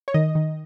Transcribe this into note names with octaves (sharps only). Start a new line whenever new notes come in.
C#5
D#3 D#5
D#3